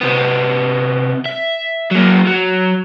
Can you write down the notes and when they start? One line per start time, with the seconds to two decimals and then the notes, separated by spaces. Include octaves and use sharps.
0.01 C3 B3
1.25 E5
1.91 F#3 A#3
2.27 F#3